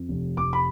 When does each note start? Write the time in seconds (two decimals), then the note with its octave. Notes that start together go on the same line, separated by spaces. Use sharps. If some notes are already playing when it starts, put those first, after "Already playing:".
Already playing: F2
0.09 F1
0.37 F1 D6
0.53 B5